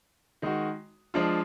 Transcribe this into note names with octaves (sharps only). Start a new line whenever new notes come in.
D#3 G#3 D#4 F#4
F3 G#3 D4 F4